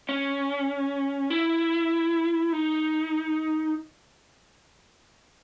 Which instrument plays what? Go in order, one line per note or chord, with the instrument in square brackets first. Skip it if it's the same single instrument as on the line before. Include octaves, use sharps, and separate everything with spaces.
[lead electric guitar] C#4
E4
D#4